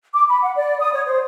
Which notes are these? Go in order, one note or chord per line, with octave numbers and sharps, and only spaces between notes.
D6
B5
F#5
D5
D#6
C#5
C5